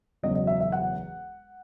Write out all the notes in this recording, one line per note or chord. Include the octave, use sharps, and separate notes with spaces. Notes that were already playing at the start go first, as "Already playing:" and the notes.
E1 E2 C#3 F#3 D#5
D#5
E5
E5
F#5